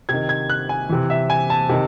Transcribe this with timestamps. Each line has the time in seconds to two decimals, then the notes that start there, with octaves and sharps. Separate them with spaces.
0.09 C3 D#3 G#6
0.29 G#6
0.50 F#6
0.69 G#5
0.89 C3 E3
1.10 E5
1.30 G#5
1.50 A5
1.69 C3 D#3